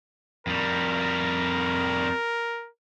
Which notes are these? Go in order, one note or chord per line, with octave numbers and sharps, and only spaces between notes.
F2 G3 A#4